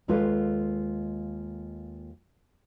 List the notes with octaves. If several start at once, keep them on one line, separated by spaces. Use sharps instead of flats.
D#2 G#3 F4 A4 B4 F5